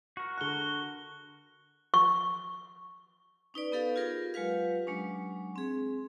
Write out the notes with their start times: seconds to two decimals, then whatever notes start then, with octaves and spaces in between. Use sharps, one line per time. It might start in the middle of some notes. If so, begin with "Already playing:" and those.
0.17 F#4 A#4
0.38 D3 C#6 F#6 G7
1.94 C#6
3.54 C#4 D#4 B4 D5
3.72 B3 D#4 G4 A4 B4 F5
3.96 F4 G4 G#4 A#4
4.34 F#3 G#3 F4 G4 B4 F5
4.87 F#3 G#3 C#4 D4
5.56 C4 G#4